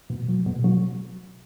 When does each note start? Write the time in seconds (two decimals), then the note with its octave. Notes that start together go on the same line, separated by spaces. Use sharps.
0.10 B2
0.28 F#3
0.46 B2
0.64 F#3